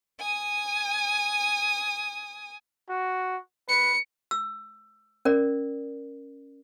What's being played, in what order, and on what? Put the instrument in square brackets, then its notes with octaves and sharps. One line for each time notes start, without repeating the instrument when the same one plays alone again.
[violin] G#5 D#6
[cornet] F#4
[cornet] B4 [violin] C#7
[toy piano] E6
C#4 A#4 D5